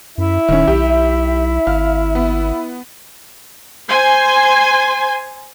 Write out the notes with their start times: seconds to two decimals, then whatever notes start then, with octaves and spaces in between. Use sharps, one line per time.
0.18 F#2 E4 E5
0.48 D#1 D#3 C#4
0.68 B1 G4
1.67 G#1 F5 F6
2.15 B3
3.88 C5 G#5 C6